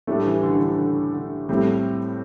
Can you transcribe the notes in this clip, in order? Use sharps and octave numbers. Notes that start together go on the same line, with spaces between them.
A2 G3 A3 D4 G4
E3
D3
D3
E3
D3
D3
A2 G3 A3 C4 G4